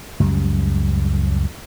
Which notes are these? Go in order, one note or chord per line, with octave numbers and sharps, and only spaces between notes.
C#2 F#2 G3